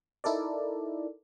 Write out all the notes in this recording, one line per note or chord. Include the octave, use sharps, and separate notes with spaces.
D#4 E4 A4 A#4 D5